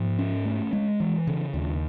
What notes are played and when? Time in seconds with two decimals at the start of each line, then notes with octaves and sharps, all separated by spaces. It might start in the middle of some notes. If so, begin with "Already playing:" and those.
Already playing: G#2 F3
0.19 C#4
0.45 A3
0.73 G#3
1.00 E3
1.27 C#3
1.54 D#2